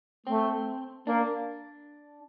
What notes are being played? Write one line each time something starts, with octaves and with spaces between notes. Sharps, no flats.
A3 C4
A#3 D4